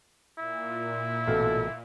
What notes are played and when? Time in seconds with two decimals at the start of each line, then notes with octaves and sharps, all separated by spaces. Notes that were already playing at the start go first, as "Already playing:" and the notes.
0.39 A#2 E4
1.28 A1 B2 A4 F5